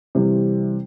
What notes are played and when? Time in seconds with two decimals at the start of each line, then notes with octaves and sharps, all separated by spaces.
0.15 C3 E3 G3 C4